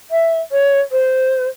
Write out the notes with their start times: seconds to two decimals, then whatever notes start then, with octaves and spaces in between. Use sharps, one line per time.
0.10 E5
0.51 C#5
0.91 C5